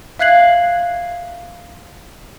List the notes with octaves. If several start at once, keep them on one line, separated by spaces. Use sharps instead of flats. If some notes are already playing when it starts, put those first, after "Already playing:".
E5 F5 F#6 G#6 C7 F#7